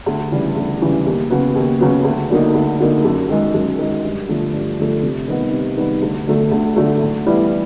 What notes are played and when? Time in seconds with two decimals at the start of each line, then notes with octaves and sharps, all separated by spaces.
0.06 D2
0.31 C#3 E3 G3
0.56 D2
0.81 C#3 E3 G3
1.06 D#2
1.30 C#3 F#3 B3
1.55 D#2
1.80 C#3 F#3 B3
2.04 D2
2.30 D3 F#3 A#3 D#4
2.54 D2
2.80 D3 F#3 A#3 D#4
3.04 F#2
3.29 D#3 G#3
3.54 F#2
3.79 D#3 G#3
4.04 G2
4.28 D3 F3 A3
4.53 G2
4.78 D3 F3 A3
5.03 C3
5.28 D#3 G3 B3 D#4
5.52 C3
5.77 D#3 G3 B3 D#4
6.02 D2
6.27 D3 F#3 A3
6.52 D2
6.76 D3 F#3 A3
7.01 A2
7.26 E3 G3 B3 E4